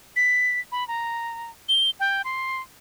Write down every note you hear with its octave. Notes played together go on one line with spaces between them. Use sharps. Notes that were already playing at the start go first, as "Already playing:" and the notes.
B6
B5
A#5
G7
G5
C6